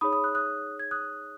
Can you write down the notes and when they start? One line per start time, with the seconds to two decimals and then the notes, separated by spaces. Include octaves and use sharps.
0.01 D#4 G#4 C#5 B5 D#6
0.13 B5 D#6
0.24 D#6 F#6
0.35 D#6 F#6
0.79 G#6
0.91 D#6 F#6